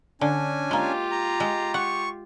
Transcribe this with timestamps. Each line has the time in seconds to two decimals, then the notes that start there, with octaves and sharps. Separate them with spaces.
0.21 D3 C#4 D4 G#5
0.71 G#3 A#3 F4 G4
1.11 A#5
1.40 G#3
1.74 F#5 C#6